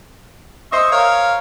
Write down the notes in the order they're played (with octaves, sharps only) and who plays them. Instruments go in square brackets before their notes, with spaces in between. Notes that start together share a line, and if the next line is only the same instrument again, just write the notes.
[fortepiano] C5 D#5 [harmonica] E5 C#6 E6
[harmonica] A#4 C#5 F5